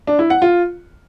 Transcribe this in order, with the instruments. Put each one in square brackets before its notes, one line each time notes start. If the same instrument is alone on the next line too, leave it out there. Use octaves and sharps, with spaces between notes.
[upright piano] D4
E4
F#5
F4